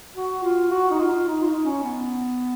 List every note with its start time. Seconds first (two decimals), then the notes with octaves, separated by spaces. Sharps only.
0.16 F#4
0.43 F4
0.71 F#4
0.91 D#4
0.99 F4
1.27 D#4
1.42 F4
1.45 D#4
1.65 C#4
1.83 B3